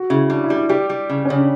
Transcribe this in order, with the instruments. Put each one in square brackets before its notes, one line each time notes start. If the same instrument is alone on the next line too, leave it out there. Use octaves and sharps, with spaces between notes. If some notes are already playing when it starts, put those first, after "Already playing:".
Already playing: [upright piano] F#4
[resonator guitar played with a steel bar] C#3 [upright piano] E4
[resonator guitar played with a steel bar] G3 [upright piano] D4
[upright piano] E4
[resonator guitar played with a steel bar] G3
[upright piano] E4
[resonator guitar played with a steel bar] G3 [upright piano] G4
[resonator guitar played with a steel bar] G3
C#3
[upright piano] C#4
[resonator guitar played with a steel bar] C#3
[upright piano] D4